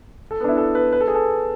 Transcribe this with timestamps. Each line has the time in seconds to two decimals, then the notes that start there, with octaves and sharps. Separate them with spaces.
0.31 A4
0.40 B3
0.44 D4
0.49 E4
0.57 A4
0.75 B4
0.93 B4
1.01 A4
1.08 G#4
1.15 A4